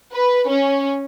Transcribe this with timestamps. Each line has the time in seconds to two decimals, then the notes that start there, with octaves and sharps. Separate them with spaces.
0.13 B4
0.48 C#4